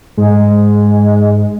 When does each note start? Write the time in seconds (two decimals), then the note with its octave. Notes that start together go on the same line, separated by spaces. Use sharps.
0.17 G#2 G#3